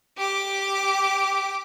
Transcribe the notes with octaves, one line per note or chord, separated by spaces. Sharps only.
G4 D6